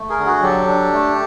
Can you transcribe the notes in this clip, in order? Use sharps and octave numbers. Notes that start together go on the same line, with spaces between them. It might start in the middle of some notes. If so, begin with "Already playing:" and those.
Already playing: A3
G#4 A#4
D3
F#4 G#4
F#3 G4 A4
D4
A3